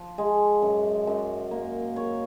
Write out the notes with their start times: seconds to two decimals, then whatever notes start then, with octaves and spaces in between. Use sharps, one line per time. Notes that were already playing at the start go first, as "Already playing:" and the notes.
Already playing: F3
0.18 G#3
0.62 F#2
1.07 F#2
1.51 A#3
1.96 C#5